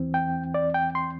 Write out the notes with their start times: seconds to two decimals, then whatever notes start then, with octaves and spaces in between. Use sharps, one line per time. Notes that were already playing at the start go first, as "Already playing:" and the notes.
Already playing: E2 E3 C4
0.14 G5
0.54 D5
0.74 G5
0.95 C6